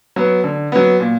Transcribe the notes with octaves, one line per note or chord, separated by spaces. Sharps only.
F#3 B3
D3
F#3 B3
A#2